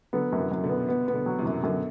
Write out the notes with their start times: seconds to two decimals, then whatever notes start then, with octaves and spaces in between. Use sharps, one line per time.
0.13 D3 F#3 B3
0.32 F#2
0.38 C3 E3
0.51 F#2
0.63 B2 D3
0.69 B3
0.88 B2 B3
1.08 B3
1.14 B2 D3
1.26 F#3
1.39 C3 E3
1.46 F#2
1.63 F#2 B2 D3